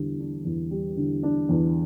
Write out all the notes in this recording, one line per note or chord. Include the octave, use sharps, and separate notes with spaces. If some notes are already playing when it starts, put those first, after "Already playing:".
Already playing: E2 D3 G3
D4
E2
G3
D3
D4
E2